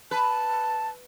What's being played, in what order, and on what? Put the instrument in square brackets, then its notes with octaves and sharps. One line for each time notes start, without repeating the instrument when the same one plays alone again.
[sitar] B4 [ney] A5